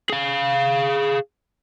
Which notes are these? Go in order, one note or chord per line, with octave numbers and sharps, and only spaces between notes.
G#4 F5